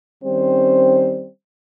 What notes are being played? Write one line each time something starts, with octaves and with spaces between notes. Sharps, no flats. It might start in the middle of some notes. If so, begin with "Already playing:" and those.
D#3 G3 C4 C#4 C5